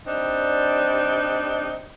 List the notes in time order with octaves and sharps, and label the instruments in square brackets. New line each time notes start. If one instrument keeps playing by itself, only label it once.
[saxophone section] G3 C4 D4 D#4